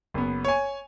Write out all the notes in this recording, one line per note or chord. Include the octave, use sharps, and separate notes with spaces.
F#1 B3
C#5 G#5